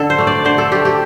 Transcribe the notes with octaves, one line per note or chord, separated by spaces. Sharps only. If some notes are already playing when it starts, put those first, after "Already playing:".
Already playing: D3 A4
C5
A3 D4
D5
D3 C5
A4
A3 D4 G4
G4